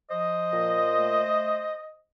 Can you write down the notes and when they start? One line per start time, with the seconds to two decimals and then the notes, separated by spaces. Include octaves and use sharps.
0.10 F3 C5 D#5
0.53 A#2
0.96 A3